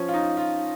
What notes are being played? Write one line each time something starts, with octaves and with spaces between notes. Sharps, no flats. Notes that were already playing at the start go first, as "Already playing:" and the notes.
Already playing: F3 C#4
F4
D#4
F4